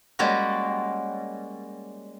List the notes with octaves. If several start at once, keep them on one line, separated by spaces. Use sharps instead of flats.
G3 G#3 A#3 C#4 F#4